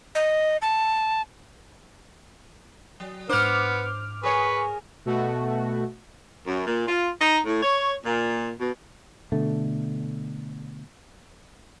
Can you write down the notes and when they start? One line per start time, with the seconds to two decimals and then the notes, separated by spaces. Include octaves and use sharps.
0.15 D#5
0.62 A5
3.00 F#3
3.29 G#2 B3 D4 C5 D6 F6
4.23 G#4 A#4 B4 C#5 G#5 C#6
5.05 B2 A3 F#4
6.47 F#2
6.66 A#2
6.87 F4
7.20 D#4
7.46 A2
7.62 C#5
8.04 A#2
8.59 B2
9.32 B2 D3 A3